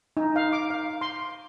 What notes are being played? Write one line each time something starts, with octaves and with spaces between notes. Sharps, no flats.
D#4
F5
D6
F5
C6